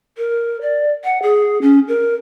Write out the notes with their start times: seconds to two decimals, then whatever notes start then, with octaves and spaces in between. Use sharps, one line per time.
0.18 A#4
0.61 D5
1.04 F#5
1.23 G#4
1.62 C#4
1.88 A#4